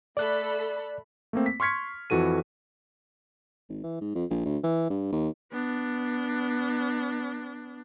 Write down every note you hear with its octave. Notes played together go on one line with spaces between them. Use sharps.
A3 A4 D5 B5 F#6
A3 A#3 C4
B6
C6 C#6 F6 G#6 B6 C#7
F2 E3 F#4 A4 D#7
G#1
E3
G#2
F2
A#1
D2
E3
G2
D#2
B3 D4